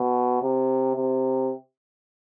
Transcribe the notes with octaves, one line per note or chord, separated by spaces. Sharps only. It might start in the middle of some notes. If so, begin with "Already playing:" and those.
Already playing: B2
C3
C3